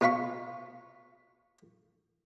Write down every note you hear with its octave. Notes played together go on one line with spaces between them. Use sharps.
B2 F4 F5 B5 C#6